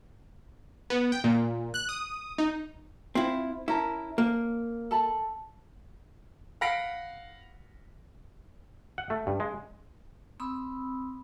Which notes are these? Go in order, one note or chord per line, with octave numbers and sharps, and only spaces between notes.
B3
G5
A#2
F#6
D#6
D#4
C4 E4 F4
C#4 E4 A#4 A5
A#3
A4 A5 B5
F5 F#5 B5 A#6 B6 D7
F#5
A3
G2
G#3
C4 B5 D#6 E6